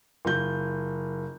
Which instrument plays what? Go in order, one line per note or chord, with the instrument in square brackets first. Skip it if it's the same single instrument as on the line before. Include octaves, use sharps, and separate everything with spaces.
[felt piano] F#1 F4 G6